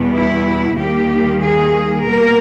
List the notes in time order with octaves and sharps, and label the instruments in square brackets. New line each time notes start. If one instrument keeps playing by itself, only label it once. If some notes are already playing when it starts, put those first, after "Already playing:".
Already playing: [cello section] E2 B2 G3 B3
E4
D#2 D#3 G3 A#3 G4
G#4
B2 G3 A#3 A#4